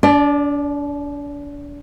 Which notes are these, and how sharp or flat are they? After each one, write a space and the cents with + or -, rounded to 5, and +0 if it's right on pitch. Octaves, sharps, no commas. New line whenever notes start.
D4 -35 D5 +15